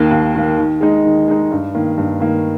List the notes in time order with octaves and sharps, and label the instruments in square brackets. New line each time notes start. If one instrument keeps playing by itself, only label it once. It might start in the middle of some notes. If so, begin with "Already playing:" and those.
Already playing: [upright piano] D#2 D#3 A#3
D#2
D#3 A#3
D#3
G#3 D#4
D#3
G#3 D#4
G2
D#3 A#3
G2
D#3 A#3